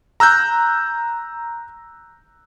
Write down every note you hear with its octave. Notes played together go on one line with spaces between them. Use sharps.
A#5 E6 F#6 G6